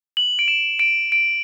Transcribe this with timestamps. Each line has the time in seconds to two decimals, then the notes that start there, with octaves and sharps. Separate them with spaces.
0.17 F#7
0.39 D7
0.48 E7
0.79 D7
1.12 D7